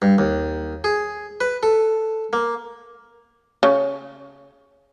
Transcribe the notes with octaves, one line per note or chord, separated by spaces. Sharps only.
G2
D#2
G#4
B4
A4
A#3
C#3